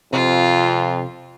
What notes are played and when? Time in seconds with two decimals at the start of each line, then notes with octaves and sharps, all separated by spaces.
0.13 F2 C3 F4